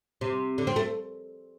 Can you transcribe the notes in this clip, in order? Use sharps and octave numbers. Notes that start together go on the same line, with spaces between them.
C3
D3
C4
A3